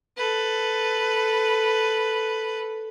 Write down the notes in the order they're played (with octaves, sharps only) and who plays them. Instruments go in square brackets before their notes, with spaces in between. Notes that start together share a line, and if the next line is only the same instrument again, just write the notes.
[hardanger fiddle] A4 B4